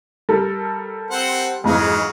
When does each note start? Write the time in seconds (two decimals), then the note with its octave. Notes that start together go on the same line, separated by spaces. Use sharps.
0.29 G3 A4 A#4
1.11 C4 C5 F#5
1.64 F2 G#2 E3 F#3 G#4 F5